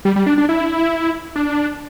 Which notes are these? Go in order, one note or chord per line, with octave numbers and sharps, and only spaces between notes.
G3
G3
D4
D4
E4
D4